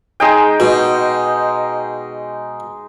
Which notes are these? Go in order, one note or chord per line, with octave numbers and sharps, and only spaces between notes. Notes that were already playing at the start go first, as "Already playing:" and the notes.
G#3 D#4 G5
B2